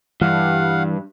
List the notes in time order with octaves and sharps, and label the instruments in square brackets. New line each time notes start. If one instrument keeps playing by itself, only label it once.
[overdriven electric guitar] G2 [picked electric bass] E3 [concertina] F5 F#5